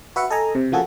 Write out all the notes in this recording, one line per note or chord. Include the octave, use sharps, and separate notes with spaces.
F#4 B4 E5 F#5 C#7
A4 D#5 G#5 A#5
C3
C#3 F3 A#3 F#4 G#4 A4